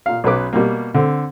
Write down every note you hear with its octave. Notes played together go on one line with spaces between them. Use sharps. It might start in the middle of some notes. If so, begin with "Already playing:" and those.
A#2 F5
B1 C#4 B4 D6
B2 G3 A#3
D3 C4